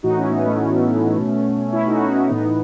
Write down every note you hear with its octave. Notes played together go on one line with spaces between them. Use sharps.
A2 E3 D#4 F#4
C#4 E4
B3 D#4
A3 C#4
B2
C#4 E4
D#4 F#4
D#4 F#4
C#4 E4
A2 E3 B3 D#4